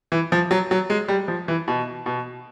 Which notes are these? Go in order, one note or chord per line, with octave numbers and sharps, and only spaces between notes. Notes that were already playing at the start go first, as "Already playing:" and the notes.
E3
F3
F#3
F#3
G#3
G3
F3
E3
B2
B2